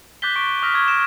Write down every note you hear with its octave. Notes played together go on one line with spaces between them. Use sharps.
D6 F#6 G6 A6 B6 G7
C#6 B6 D7
D6 D#6 F6 A#6 B6 D7
C#6 F6 G#6
F6 A#6 D7 E7